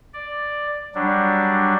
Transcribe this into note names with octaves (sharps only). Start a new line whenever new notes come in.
D5
F#3 G3 D4